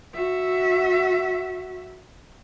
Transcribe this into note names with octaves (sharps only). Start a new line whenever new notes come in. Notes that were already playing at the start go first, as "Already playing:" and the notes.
F#4 E5